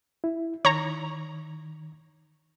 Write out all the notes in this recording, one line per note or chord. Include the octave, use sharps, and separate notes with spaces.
E4
D#3 C#5 A#5